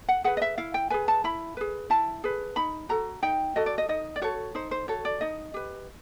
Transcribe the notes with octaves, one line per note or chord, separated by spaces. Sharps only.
F#5
G#4 B4 F#5
D#5
E5
E4 F5
G5
G#4 B4 G#5
A5
E4 B5
G#4 B4
E4 A5
G#4 B4
D#4 B5
F#4 A4 A#5
D#4 G5
F#4 A4 D#5
D5
D#5
D#4 D#5
D5
F#4 A4 C#5
D#4 C5
C5
F#4 A4 C#5
D5
D#4 D#5
G4 B4